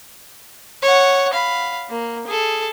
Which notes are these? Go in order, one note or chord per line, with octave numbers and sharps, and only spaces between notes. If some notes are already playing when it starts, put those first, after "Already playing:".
C#5 F#5
F5 B5
A#3
G#4 A4